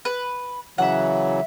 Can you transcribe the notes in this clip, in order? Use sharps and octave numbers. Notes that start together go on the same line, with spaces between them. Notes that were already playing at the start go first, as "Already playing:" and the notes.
B4
C#3 E3 F#3 E5 F#5